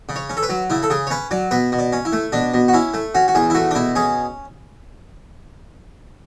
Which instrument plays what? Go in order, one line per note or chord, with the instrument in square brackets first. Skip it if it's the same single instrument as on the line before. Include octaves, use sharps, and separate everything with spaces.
[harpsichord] C#3
C#5
C#4
A4
B4
F#3
C#3 E4
A4
C#3 G#4
C#5
C#4 B4
F#3 D5
B2 B4
B2
D5
C#4
E4
A3
B2 D4
B2
F#4
C#4 E4
A3
C#4 F#4
F#4
E2 G#4
E4
A3 F#4
D4
B2 E4
C#4 G#4